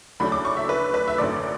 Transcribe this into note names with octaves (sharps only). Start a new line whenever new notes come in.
D2 C#3 F#3 A3 D4 B5
D6
C#6
E5
B4
B4
E5
G#1 F#2 D3 A3 D5